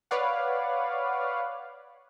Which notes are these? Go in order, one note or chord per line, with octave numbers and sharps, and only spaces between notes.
B4 C#5 D5 F5 F#5